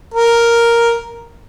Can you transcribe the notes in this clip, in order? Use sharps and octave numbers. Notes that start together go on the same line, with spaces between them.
A#4